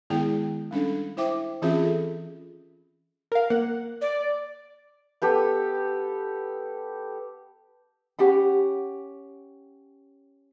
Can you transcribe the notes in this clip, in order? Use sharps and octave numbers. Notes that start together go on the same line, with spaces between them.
D#3 G#3 B3 E4 G#4 G5
G3 C#4 D4 A4
E4 C5 E5 G5 D6
E3 C4 C#4 F4 G#4 E5
A4
A#4 F5
A#3 F#5
D5
B3 G4 A4
C#4 G4 F#5 B5